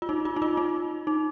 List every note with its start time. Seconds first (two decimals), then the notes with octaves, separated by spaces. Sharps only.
0.02 F4
0.09 D#4
0.25 F4
0.36 D#4
0.42 F4
0.57 D#4
1.07 D#4